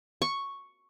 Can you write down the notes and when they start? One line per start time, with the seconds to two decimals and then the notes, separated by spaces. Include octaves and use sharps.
0.22 C#6